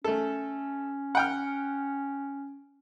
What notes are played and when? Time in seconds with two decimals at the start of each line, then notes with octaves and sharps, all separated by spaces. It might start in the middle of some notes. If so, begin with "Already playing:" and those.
0.04 A3 C#4 A4
1.15 F#5 G5 F6